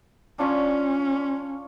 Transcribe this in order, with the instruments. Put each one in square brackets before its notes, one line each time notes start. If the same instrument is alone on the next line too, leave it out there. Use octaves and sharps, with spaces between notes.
[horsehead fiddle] C#4 [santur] D4 F4 C#5